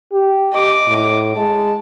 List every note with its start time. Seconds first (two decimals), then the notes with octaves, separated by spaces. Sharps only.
0.12 G4
0.53 D#5 D6
0.87 A2
1.36 G#3 A5